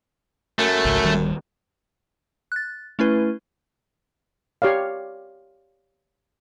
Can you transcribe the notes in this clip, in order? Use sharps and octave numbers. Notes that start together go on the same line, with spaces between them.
F#2 A3
G#1 C#2
D1 D#3 G3
F#6 A6
A3 C#4 E4 B4
G4 C#5 D5 F5